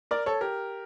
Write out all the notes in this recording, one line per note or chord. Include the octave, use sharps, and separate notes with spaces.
A#4 D5
A4 C#5
G4 A#4